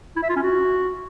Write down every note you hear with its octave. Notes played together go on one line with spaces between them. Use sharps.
E4
E5
F4
C#4
F#4